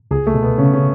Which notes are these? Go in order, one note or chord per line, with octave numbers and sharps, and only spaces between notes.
C#2 G#4
A3
B2
B3
C#3 C#4
C#4